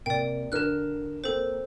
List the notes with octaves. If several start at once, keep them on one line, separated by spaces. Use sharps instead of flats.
C3 A#3 D5 G5
D3 A#4 F6 F#6 E7
A#3 C4 A4 C5